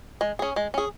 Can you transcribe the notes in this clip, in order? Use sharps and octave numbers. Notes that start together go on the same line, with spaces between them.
G#3
C#4 G#4
G#3
C#4 G#4